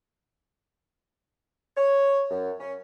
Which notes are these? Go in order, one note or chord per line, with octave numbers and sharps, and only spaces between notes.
C#5
F#2
C#4